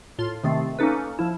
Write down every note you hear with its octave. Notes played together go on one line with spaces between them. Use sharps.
A2 F4 C6
C3 D#3 A3 C4
A#3 C#4 D#4 A4 B4
F3 E4